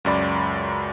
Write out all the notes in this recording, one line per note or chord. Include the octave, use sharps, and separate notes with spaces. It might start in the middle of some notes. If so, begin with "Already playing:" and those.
C#2 F#2 D5 B5